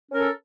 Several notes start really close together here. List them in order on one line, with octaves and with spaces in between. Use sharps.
C#4 A#4 A4